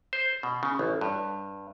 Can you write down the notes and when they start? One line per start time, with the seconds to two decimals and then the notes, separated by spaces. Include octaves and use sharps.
0.13 C5
0.43 B2
0.63 C#3
0.79 A1
1.01 G2